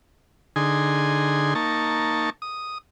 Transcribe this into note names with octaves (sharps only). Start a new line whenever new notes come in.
D3 D#4 G#4 G#5 C6
A#3 D#4 A5 C#6
D#6